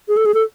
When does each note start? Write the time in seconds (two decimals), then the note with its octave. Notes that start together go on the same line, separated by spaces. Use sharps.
0.08 G#4
0.17 A4
0.26 G#4
0.34 A4